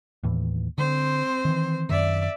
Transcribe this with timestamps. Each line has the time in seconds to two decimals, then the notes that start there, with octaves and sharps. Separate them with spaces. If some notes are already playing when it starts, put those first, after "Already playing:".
0.23 D#2 A2 E3
0.78 D3 C4 C5
1.45 D#3 E3
1.89 F#2 D#3 D5 E5